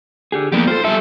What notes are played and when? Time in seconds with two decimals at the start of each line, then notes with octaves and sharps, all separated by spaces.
0.32 D3 G4 G#4
0.52 F3 G3 A#3 B3 G4
0.68 F4 G4 A4 C5
0.85 G3 A4 E5